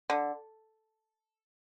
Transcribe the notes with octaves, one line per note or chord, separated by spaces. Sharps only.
D3